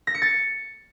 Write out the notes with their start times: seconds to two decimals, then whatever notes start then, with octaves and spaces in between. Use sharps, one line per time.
0.07 A#6
0.14 C#7
0.22 A6